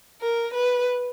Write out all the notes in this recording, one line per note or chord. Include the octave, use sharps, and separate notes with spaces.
A#4
B4